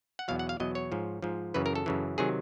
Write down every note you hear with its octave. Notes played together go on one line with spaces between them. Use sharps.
F#5
E2 B2 F#3 F5
F#5
F5
E2 B2 F#3 D#5
C#5
G#2 F3
G#2 F3
F#2 C#3 E3 B4
A#4
A4
F#2 C#3 E3
C3 D#3 F#3 G#4